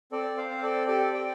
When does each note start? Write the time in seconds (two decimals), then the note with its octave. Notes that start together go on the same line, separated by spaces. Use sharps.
0.12 C4 A4 D5
0.37 C5 F5
0.50 C4
0.58 F5
0.63 A4 D5
0.87 G4 A4 D5
1.13 D5 G5